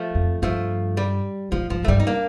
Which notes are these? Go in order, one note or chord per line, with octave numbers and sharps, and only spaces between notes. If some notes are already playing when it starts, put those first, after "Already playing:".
Already playing: F3 A3
F2
G2 F3 A3
G3
A2 F3
G2 F3
A2 A3
G2 G3
D#4
A#3 D4